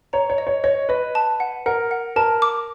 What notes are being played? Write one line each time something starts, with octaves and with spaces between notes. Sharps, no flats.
C#5 A#5
C#5
D#5
C#5
C#5 D#5
B4 D#5
A5
F#5
A#4 F#5
F#5
A#4 A5
D6